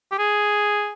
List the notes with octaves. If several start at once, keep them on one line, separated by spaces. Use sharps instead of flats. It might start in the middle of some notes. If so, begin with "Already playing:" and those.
G4
G#4